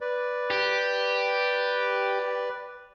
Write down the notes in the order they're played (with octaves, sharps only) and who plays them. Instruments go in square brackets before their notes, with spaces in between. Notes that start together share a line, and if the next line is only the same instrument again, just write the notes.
[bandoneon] B4 D5
[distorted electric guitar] G4